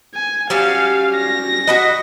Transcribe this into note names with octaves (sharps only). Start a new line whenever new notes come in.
G#5
F#3 G3 C#4 F5
A#6
F#4 B4 D#5